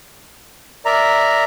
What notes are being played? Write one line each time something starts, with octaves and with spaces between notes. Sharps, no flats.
A#4 D5 E5 A#5